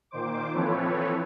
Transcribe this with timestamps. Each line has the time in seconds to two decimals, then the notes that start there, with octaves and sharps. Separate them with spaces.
0.11 A#2 D#3 C5 D6
0.54 E3 F3 C4 A4 B4 C#5